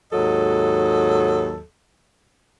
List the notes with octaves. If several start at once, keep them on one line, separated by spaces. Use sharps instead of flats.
D#2 G#2 F#3 A4 D#5